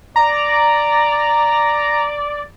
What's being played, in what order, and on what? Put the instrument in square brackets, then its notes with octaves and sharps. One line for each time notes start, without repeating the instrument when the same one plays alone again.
[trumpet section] D5 [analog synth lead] A#5